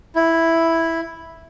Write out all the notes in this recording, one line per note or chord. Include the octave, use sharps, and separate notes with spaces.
E4